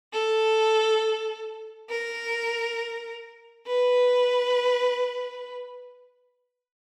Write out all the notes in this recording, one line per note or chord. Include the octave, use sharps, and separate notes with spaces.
A4
A#4
B4